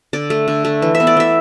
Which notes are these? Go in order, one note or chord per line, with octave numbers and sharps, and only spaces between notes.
D3 D5
A3
D3
A3
E3
E5
B3
D5
E3 E5